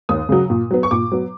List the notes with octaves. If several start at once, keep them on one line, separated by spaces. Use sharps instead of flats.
D#2 D#6
C#3 F#3
A#2
F#3 B3
C#6
A#2 D6
F#3 B3